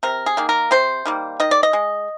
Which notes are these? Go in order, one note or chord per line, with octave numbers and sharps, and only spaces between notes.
C3 A#4
G#4
D#3 A#3
A#4
C3 C5
D#3 G3 A#3
D#3 D#5
D5
D#5
G#3